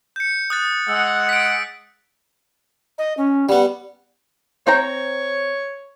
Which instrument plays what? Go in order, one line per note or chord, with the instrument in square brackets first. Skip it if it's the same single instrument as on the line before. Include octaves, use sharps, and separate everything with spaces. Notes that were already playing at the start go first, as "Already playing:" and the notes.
[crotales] G6 C#7
D#6 F#6 A6
[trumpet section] G#3 F#5 [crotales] E6
[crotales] B6 D7
[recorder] D#5
C#4
[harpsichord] G3 B3 [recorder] F#5
[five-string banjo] C4 G5 A#5 [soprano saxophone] C#5